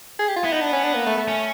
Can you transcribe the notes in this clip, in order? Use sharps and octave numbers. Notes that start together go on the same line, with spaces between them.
G#4
G4
F4
B3 E4
D#4
D4
C#4
D4
A#3
A3
A3
C#4